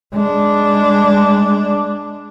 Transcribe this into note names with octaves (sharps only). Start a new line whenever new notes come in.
G#3 D4